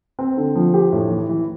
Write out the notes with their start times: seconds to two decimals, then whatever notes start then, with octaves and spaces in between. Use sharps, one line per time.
0.19 C4
0.37 D3
0.56 F3
0.74 G4
0.92 A2
1.10 E3
1.29 E3